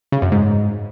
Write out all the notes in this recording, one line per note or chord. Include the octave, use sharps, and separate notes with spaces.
C#3
F#2
G#2